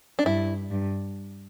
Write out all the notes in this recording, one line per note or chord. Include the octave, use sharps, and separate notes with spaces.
D4
G2 E4
G2